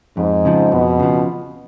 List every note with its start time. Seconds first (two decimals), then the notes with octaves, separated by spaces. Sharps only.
0.17 F2 G#2
0.45 C#3 F3
0.72 F2 B2
1.00 C#3 F3